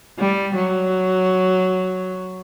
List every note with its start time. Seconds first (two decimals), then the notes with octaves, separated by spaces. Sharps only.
0.19 G3
0.55 F#3